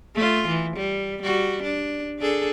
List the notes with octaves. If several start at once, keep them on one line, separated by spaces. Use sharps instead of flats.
A3 F4
E3
G3
G3 F#4
D4
D4 G#4 A4